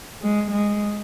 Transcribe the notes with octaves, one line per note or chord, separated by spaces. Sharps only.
G#3
G#3